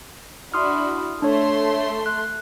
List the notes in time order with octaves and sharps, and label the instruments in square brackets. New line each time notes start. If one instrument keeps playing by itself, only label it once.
[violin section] D4 E4 F#4 [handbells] C6 D#6 F6
[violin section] A3 C6 [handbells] D4 C#5
[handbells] F#6